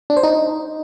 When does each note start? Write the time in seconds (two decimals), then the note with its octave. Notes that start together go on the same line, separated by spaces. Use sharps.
0.10 D4
0.17 C5
0.23 D#4